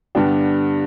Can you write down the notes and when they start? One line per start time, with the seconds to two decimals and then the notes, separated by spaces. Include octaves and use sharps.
0.15 G2 D3 G3 B3 D4 G5